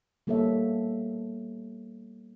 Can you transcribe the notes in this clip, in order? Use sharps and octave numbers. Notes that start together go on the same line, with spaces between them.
G3 A#3 B3 A4 C#5 E5